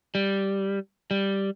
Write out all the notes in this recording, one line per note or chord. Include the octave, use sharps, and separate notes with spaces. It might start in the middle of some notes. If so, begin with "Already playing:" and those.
G3
G3